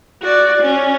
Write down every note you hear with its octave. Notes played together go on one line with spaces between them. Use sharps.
F#4 D5
C#4